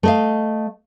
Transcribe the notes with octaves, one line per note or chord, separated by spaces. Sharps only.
A3 D#5 F5